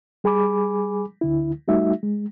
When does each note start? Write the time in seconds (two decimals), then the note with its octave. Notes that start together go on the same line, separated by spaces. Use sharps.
0.24 G3 G#4 G#5 B5 D6
1.21 D2 D3 E4
1.68 G3 A3 D#4 F#4 E5
2.03 G#3